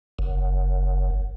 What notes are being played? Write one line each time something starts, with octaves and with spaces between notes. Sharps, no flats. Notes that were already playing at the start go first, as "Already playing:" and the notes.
F#1